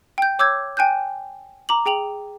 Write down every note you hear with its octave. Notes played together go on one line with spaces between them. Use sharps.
G5 G6
C#5 D6 E6 G6 G#6
G5 G#5 F#6 G6
A#5 D6 F#7
G#4 G5 F7 F#7